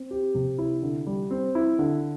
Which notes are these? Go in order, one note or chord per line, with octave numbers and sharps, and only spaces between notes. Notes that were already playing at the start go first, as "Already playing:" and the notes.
Already playing: C4
G4
C3
E4
D3
G3
C4
E4
D3